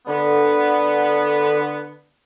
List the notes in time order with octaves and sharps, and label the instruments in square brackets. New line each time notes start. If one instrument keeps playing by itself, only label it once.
[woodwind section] D3 B3